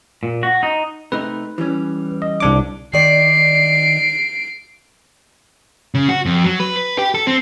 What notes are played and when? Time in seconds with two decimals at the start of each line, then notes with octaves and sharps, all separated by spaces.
0.23 A#2
0.43 F#4
0.63 D#4
1.12 C3 A3 D#4 B4
1.58 E3 G3 C#4
2.22 D#5
2.40 C2 D4 D6
2.93 D#3 D5 C7 D7
5.95 C#3
6.09 F#4
6.26 F2
6.44 F#3
6.60 B4
6.77 B4
6.98 G4
7.15 A4
7.27 C4